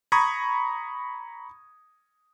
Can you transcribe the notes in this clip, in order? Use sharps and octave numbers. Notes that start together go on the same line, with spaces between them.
A#5 B5 C#6 D#6 G#6